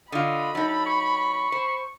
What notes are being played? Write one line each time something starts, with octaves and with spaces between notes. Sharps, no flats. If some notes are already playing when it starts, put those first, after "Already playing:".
D3 F4 D#5 B5
F#3 D#4 A4
C#6
C5